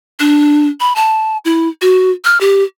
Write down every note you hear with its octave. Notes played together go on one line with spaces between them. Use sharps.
D4
B5
A5
E4
F#4
F6
G4